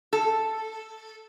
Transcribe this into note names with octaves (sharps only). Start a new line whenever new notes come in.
A4